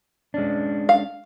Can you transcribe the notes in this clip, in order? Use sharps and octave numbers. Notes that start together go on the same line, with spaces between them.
G#3 C#4 D4
F5